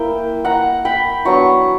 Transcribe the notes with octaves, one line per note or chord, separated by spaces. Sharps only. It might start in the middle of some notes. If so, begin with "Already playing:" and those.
Already playing: A#3 E4 G5
F#5 A#5
G5 B5
F#3 B3 D4 A#5 C#6